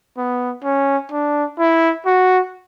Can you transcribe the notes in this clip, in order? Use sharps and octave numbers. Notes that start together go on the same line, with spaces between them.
B3
C#4
D4
E4
F#4